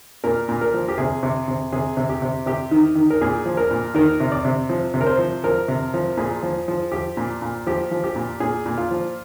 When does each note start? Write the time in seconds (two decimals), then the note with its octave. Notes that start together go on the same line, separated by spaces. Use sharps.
0.24 A#2 A#4
0.49 A#2
0.61 A#4
0.74 F3
0.88 G4
0.98 C3 G#4
1.23 C3
1.48 C3
1.72 C3 G#4
1.97 C3
2.09 G4
2.22 C3
2.46 C3 G4
2.71 D#3
2.95 D#3
3.10 A#4
3.21 A#2 G#4
3.46 F3
3.57 A#4
3.71 A#2
3.94 D#3 A#4
4.20 C3
4.32 D5
4.45 C3
4.69 F3
4.94 C3
5.01 A#4
5.06 C5
5.18 F3
5.44 F3 A#4
5.68 C3
5.94 F3
6.17 A#2 G#4
6.43 F3
6.68 F3
6.92 F3 G4
7.17 A#2
7.42 A#2
7.67 F3 G4
7.91 F3
8.04 G4
8.16 A#2
8.40 A#2 G#4
8.66 A#2
8.78 F4
8.91 F3